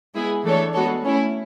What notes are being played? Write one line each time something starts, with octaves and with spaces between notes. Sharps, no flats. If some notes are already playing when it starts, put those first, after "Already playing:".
G#3 B3 E4 G#4
E3 A3 D4 A4 C#5
G#3 B3 F#4 A4 C#5
A3 C#4 E4